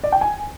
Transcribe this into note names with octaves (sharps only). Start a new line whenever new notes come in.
D5
G5
G#5